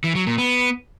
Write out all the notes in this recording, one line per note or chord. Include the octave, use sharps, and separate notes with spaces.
E3
F#3
A#2
B3